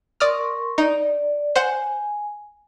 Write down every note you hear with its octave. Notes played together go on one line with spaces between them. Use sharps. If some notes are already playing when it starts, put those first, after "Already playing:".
A#4 D5 C6 C#6 D#6 F6
D#4 D5
C5 F#5 G#5 E7